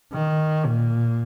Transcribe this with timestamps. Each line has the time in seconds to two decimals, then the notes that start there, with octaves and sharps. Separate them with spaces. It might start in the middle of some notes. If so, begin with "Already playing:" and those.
0.13 D#3
0.65 A#2